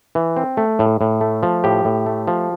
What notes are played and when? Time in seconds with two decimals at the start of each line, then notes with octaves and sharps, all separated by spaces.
0.15 E3
0.37 C4
0.57 A3
0.79 A2
1.01 A2
1.21 A3
1.43 F3
1.64 A2 G4
1.85 A2
2.06 A3
2.28 F3